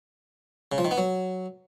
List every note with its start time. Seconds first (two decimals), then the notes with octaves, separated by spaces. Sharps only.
0.72 C#3
0.78 F3
0.85 D#3
0.91 B3
0.98 F#3